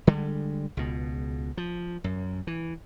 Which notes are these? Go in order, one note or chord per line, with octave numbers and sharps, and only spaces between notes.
D3 G3 G#3
C#2 B2
F3
F#2
E3